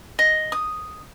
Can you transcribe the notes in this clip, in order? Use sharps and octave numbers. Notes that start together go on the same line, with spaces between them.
D#5
D#6